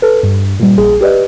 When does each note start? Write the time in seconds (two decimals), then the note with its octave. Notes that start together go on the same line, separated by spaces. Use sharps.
0.02 A4 B4
0.23 G2
0.60 A#2 G3
0.78 A#1 G#4
1.01 G4 B4 D5 D#5